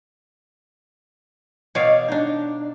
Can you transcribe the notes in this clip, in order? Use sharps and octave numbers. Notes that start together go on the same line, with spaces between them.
B2 C#5 D5 F5
D4 D#4